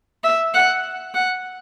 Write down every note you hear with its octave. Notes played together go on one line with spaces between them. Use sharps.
E5
F#5
F#5